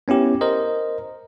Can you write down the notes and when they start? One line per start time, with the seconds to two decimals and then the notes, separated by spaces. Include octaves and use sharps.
0.08 B3 C#4 E4 G4
0.41 A#4 C5 D#5